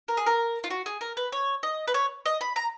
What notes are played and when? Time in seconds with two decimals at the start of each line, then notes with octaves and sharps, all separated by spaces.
0.08 A#4
0.17 G#4
0.26 A#4
0.64 F4
0.70 F#4
0.86 G#4
1.01 A#4
1.17 B4
1.32 C#5
1.63 D#5
1.87 B4
1.94 C#5
2.26 D#5
2.41 B5
2.56 A#5